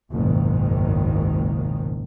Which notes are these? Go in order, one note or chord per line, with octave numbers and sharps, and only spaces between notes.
F#1 C#2 G#2 B2 D#3